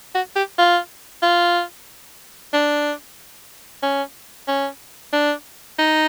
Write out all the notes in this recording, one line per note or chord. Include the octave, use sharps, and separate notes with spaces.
F#4
G4
F4
F4
D4
C#4
C#4
D4
D#4